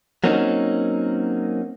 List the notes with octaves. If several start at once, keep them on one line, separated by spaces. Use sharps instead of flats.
F#3 A#3 C4 C#4 D#4